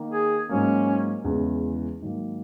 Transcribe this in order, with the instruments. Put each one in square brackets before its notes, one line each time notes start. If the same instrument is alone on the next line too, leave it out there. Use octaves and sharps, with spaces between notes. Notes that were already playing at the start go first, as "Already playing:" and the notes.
Already playing: [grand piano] D#3 A#3 D#4
[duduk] G#4
[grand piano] G#2 F#3 A#3 [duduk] C#4
[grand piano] E2 C#3 E3 G#3 C#4
G#2 D#3 F#3 A#3